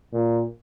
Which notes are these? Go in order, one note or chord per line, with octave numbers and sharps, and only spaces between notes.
A#2